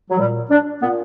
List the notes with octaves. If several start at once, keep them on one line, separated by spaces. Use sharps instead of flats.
F#3
A#2 G3
D4
A#2 B3